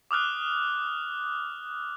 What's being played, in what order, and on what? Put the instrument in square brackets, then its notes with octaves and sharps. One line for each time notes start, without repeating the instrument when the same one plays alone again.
[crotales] D6 D#6 F6 F#6